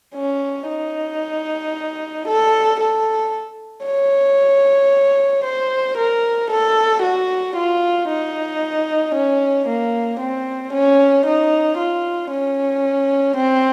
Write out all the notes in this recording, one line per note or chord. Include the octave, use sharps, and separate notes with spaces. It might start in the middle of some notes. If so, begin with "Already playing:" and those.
C#4
D#4
A4
A4
C#5
C5
A#4
A4
F#4
F4
D#4
C#4
A#3
C4
C#4
D#4
F4
C#4
C4